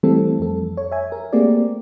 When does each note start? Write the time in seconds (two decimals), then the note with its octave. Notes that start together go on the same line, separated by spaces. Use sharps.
0.03 E3 G3 A3 C4 A4
0.39 F2 A4
0.77 C#5
0.92 E5 G#5
1.12 A#4
1.33 A3 A#3 C4 G4 G#4 D5